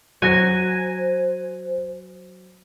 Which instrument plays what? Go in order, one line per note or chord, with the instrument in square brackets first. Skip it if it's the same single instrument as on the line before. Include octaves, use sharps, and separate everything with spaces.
[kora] F#3 [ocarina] C5 [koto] G#5 [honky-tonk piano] F#6 A#6